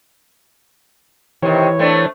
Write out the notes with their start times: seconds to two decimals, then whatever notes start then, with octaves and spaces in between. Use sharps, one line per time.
1.43 C3 D#3 E3 C#5
1.79 A3 C4 D4